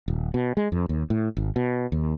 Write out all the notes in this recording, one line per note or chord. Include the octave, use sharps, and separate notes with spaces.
D#1
B2
G#3
F2
D#2
A2
G#1
B2
D#2